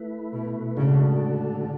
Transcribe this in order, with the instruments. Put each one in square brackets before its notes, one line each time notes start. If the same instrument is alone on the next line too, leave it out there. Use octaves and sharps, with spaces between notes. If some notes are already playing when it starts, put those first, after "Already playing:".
Already playing: [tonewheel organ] A3 E4 B4
[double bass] B2
[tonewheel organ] A2 G#3 D4 F#4 A4 [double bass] C#3
[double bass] D3